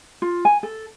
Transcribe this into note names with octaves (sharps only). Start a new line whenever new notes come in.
F4
G#5
A4